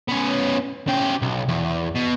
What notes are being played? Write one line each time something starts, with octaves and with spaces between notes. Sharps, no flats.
B3 C#4
C#3 G4
B1
E2
B2